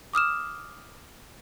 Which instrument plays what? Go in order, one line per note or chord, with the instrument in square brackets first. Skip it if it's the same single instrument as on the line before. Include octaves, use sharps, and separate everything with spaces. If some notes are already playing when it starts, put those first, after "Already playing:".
[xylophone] D6 D#6 F6 E7